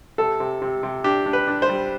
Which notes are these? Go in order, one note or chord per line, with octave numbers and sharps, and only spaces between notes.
C3 A4
C3
C3
C3
D4 G4
D4
B4
D4
C5
G3